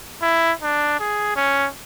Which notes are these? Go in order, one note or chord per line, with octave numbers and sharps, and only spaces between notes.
E4
D4
G#4
C#4